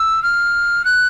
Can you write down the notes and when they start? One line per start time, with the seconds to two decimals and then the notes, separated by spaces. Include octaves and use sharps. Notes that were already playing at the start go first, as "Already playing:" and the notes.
Already playing: E6
0.22 F6
0.85 F#6